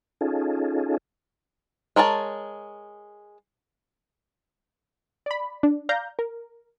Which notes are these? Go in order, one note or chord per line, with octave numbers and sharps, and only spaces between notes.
C#4 D#4 F4 G#4 A4
G#3 A#4 C#5 A5
D5 B5
D4
D5 F5 A#5 G6
A#4